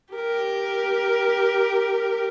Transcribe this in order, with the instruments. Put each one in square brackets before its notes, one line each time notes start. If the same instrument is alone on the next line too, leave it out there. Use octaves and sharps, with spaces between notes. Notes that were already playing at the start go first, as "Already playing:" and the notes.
[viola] G4 A#4